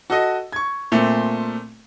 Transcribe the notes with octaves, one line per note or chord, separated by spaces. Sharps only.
F#4 A4 D#5
C#6 G#6
A#2 A3 C4